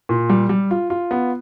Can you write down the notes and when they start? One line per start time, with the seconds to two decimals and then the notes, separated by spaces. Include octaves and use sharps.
0.09 A#2
0.30 G3
0.49 G3
0.71 F4
0.90 F4
1.11 B3